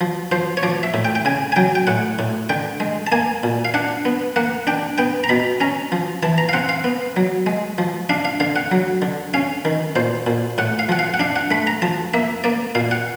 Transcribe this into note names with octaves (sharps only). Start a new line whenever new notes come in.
F3
F3 C5
C#5
F3 D5
E5
A2
G5
G5
C#3 G#5
G#5
F#3 G5
G5
A2 F#5
A2
D3 G5
G#3
A5
A#3 G#5
A#2
F5
D4 F#5
B3
A#3 F#5
D4 G5
B3 G5
A#5
B2 B5
C#4 A#5
F3
E3 A5
A#5
F5
C4 F#5
F5
B3
F#3
G#3
F3
D4 F5
F5
D3 F5
F#5
F#3
D3
C#4 F5
D#3
A#2 C5
A#2
A2 F#5
F5
F3 F#5
F5
F#5
D4 F5
F#5
A3 B5
A#5
F3 A5
A#3 E5
A#3 D5
A#2 F5
F#5